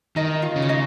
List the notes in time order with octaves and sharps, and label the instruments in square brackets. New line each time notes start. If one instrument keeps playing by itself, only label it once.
[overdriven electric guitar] D#3 [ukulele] D#4 D#5
[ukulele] F4 F5
[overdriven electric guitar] C#3
[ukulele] C#5
D#4 D#5